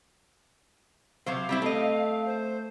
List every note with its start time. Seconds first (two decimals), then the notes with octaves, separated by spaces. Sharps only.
1.26 C3 F#3 C5 F5
1.49 G3 C4 E4
1.62 A3 C4 D#5
2.26 C5